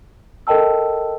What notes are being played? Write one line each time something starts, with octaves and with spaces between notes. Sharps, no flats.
A4 A#4 D#5 G5 A5 E6